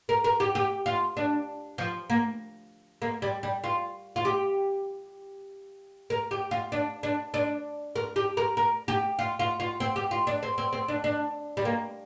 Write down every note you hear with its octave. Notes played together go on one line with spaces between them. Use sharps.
A#4
A#4
G4
G4
F4
D4
F3
A#3
A#3
G3
G3
F4
F4
G4
A#4
G4
F4
D4
D4
D4
A#4
G4
A#4
A#4
G4
F4
F4
F4
C4
G4
F4
D4
C4
C4
C4
D4
D4
G3
A#3